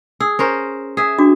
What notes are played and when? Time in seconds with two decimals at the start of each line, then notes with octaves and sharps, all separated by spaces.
0.20 G#4 E6
0.39 C#4 A#4 C5
0.97 G#4 E5
1.19 D4 F#4 D6